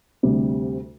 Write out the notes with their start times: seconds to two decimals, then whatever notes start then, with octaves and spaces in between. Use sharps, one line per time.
0.23 D2 C3 G3